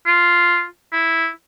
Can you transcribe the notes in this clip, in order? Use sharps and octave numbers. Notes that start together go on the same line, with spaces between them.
F4
E4